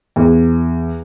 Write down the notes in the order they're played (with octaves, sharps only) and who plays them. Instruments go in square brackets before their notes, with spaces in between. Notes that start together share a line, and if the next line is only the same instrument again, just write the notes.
[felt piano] E2